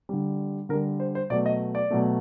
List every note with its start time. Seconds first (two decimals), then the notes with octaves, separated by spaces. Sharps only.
0.09 D3 G3
0.69 D3 A#4
0.73 G3
1.00 C5
1.15 C5
1.30 B2 F#3 A3 D5
1.46 D#5
1.75 D5
1.90 B2 F#3 A3